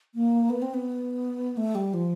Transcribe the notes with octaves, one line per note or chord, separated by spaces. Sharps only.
A#3
B3
C4
B3
A3
G3
F3